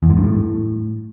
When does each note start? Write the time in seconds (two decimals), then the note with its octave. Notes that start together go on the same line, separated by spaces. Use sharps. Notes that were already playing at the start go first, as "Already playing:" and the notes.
0.03 E2
0.10 G#2
0.17 G2
0.24 A2